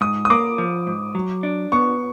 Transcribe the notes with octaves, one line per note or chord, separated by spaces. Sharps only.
G#2 D#6
D#6
A#3 D6
F3
G#2
F#3
D4
B3 C#6